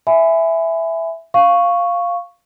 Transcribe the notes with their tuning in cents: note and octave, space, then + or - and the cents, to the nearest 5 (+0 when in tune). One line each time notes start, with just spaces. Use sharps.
E5 +0 G#5 +0 B5 +30
F5 +0 C#6 +0